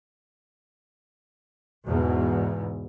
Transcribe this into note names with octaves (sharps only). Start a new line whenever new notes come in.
E2 G#2 B2